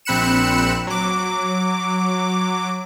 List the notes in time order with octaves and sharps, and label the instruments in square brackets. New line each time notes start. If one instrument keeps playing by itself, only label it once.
[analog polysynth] A#1 C4 B5 F#6 C#7 E7
F#3 D6